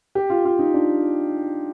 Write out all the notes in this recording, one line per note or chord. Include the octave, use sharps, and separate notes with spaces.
G4
F4
F4
D#4
D4